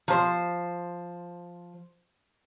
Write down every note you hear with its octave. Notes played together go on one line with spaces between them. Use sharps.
F3 C5